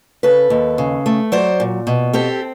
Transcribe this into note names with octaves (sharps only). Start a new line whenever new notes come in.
C#3 A4 B4
D#2
C#3
A3
F#3 C5 D5
A#2
B2
C4 G4 A4